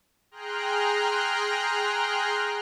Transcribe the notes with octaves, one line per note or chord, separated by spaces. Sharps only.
G#4 G5 A#5 C6 F6 F#6